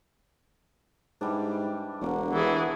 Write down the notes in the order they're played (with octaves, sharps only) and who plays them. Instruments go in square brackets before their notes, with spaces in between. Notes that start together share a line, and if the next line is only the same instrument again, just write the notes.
[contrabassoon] G#2 [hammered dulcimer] E3 G3 D4
[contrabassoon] E1 [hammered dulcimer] D3 A#3 F#4
[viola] E3 G#4